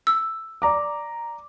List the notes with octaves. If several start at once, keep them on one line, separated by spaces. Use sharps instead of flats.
E6
D5 A#5 D6